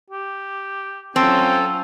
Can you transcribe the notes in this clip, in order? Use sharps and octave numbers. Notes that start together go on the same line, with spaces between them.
G4
F#3 C4 C#4 F4 A4 G5